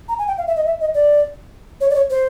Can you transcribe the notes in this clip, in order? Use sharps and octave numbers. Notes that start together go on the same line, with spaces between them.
A#5
G#5
G5
F5
E5
D#5
E5
D#5
D5
C#5
D5
C#5
C5